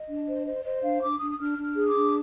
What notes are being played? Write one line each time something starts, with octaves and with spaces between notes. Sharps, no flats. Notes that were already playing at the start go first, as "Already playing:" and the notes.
Already playing: D#5
D4
C5
C5
C5 D#5
D4 F5
D4 D6
D4 D#6
D#6
D4 F6
D4
F6
G#4
D6
D4